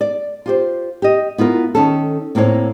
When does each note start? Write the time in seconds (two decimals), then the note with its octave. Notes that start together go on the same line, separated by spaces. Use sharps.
0.01 D5
0.46 F4 G4 C5
1.02 G4 D#5
1.38 B3 E4 F4 A#4
1.75 D#3 C#4 A4
2.35 A2 A#3 C4 A4 C#5